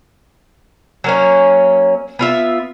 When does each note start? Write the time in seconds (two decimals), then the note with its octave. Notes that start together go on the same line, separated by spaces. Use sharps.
1.04 F#3 A#3 C#4
2.19 B3 F4 E5